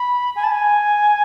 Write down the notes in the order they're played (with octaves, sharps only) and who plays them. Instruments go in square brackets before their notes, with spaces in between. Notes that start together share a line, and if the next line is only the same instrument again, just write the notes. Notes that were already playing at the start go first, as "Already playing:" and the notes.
Already playing: [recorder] B5
G#5
A5
G#5